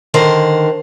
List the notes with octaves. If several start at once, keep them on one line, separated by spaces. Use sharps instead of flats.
D3 D#3 A#4 C5